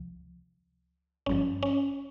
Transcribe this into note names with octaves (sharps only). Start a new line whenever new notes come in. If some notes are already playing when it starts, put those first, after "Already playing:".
Already playing: C#2 C3 F3
G#1 G2 F3 C#4
C#4